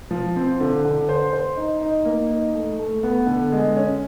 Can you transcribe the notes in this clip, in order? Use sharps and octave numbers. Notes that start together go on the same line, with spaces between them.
F3
C4
D3
D3
C5
C5
D#4
D#4
A#3
D#4
A3
A3
B3
D3
G#3
C#4